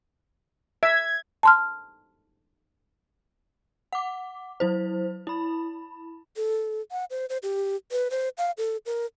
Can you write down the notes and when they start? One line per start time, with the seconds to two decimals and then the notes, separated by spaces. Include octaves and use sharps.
0.83 E5 G#6
1.43 A5 C6 F6
3.93 F#5 D6
4.60 F#3 E4 C5
5.27 E4 B5
6.36 A4
6.91 F#5
7.10 C5
7.29 C5
7.43 G4
7.92 B4
8.11 C5
8.38 F5
8.58 A4
8.86 A#4